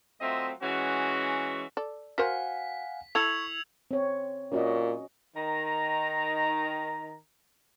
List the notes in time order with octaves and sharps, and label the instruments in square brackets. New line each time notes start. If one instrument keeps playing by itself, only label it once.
[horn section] F#3 A3 C4 F4 D#5 E5
E3 G#3 C#4 F#4
[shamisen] A4 D5
[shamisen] F#4 A#4 C5 [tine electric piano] F5 F#5 G#5 [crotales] B6
[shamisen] E4 A4 [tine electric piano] C#6 [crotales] E6 G#6 F7
[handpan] C4 C#5
[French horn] A#2 [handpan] C#4 F#4 D#5
[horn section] D#3 A#5